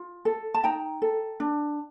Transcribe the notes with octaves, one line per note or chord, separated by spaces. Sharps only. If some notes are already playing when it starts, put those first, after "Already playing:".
Already playing: F4
A4
A5
D#4 G5 A#5
A4
D4